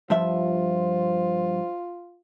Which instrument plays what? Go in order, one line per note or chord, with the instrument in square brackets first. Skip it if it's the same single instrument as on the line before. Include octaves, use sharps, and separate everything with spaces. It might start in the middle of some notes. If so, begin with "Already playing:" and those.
[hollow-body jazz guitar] G2 F3 E5 [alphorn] F4 [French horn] C5